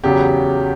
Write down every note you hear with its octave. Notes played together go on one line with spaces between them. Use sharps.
E2 C#3 F#3 G4